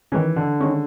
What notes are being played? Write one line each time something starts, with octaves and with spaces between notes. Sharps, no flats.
D#3 E3 G#3 C#4
D3
D#3 G#3 C#4